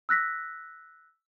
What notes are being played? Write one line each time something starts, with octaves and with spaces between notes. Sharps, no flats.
E6 F#6 A#6 B6